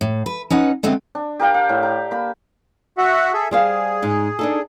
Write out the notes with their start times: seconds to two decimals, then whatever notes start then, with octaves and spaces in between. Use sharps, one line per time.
0.01 A2
0.26 B4
0.50 C#4 D#4 B4 F#5
0.83 D3 G#3 A3 B3 C4
1.15 D4
1.39 G4 A#4 F5 G5
1.54 F5
1.69 A2
1.83 A#5
2.11 A#3 B5
2.98 F#4 E5 F#5
3.33 G#4 A4 E5
3.51 G3 G#4 C5 F5
4.02 G#2 D#4
4.39 D4 D#4 A4